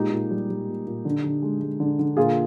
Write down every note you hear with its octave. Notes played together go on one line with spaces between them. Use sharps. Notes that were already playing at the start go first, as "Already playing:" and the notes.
Already playing: A#2 G#3 D#4 G4
A#2
G3
G3
A#2
A#2
D3
D3
G#3
G#3
D3
D3
A#2 F4 G#4